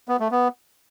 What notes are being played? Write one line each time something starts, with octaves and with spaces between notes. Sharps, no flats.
B3
A3
B3